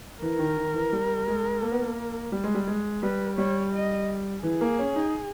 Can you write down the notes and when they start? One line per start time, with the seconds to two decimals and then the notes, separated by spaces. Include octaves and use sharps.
0.22 E3 A#4
0.39 D#3
0.57 D#3
0.74 E3
0.93 G3
1.28 G#3
1.62 A#3
1.72 B3
1.82 A#3
2.32 G3
2.44 G#3
2.55 G3
2.67 G#3
3.03 G3 B4
3.37 G3 C#5
3.74 D#5
4.43 E3 G#4
4.61 A#3
4.79 C#4
4.96 D#4